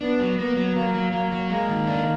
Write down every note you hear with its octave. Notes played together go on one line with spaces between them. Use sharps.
B3 D4
F#3
A#3 B3
F#3
F#3 A#3
F#3
F#3 A#3
F#3
G#3 A#3
D#3
D4